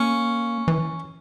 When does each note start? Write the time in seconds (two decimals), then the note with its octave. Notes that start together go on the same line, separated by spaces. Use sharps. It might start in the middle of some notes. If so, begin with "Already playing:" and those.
Already playing: A#3 C#4
0.68 E3